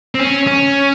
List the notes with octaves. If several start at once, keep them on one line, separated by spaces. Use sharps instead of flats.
C4
C#4
C#4